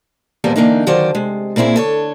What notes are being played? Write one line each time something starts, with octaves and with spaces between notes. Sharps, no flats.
E2 A#2 F3 G3 B3 A#4
D3 E3 A#3 D4 D#4
D3 D#3 F#3 F4 C5 D5
C3 G#3
A#2 A#3 C4 E4 G#4
D3 A4 C#5